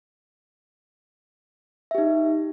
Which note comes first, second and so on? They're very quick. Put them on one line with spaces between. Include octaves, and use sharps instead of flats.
E5 G4 D#4